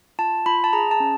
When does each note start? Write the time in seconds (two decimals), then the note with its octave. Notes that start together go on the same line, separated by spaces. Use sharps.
0.19 F4 A5
0.46 F4 B5
0.64 A5
0.73 G#4 A#5
0.91 A5
1.00 C#4